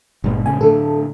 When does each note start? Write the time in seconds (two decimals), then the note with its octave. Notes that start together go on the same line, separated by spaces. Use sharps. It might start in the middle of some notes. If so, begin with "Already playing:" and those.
0.24 G1 A#2 G#3
0.46 A2 C#3 G#5
0.61 A2 D3 A3 A4